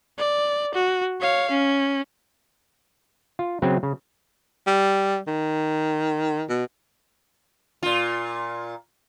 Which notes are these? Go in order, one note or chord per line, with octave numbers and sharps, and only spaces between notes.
D5
F#4
C#5 F5
C#4
F4
C#3 F#3 C4
C#3
G3
D#3
B2
A#2 F4